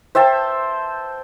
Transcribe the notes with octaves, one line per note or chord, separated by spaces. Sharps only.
C5 E5 G5 A5